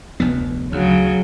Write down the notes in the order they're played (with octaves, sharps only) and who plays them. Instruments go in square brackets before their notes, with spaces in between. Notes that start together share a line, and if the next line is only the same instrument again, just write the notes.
[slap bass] F1 D2 B3
[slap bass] D2 [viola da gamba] C#3 F#3